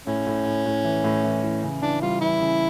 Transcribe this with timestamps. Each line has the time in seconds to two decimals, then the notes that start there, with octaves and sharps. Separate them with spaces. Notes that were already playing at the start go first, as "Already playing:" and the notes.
0.07 A2 C#4
0.27 A2
0.46 A2
0.66 A2
0.85 E3
1.04 A2
1.24 E3
1.43 E3
1.63 C#3
1.82 E3 D4
2.02 G3 F4
2.21 E3 E4
2.40 C#3